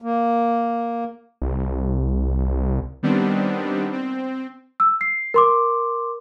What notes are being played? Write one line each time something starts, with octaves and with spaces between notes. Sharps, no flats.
A#3
C2
D#3 G3 B3 C4 D4
C4
E6
C7
A#4 C6 D6